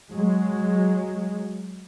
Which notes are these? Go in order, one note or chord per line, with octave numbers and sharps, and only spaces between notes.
F#3 G#3